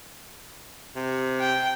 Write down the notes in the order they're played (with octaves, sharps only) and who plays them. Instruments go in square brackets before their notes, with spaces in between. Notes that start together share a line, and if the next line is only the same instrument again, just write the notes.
[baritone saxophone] C3
[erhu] G5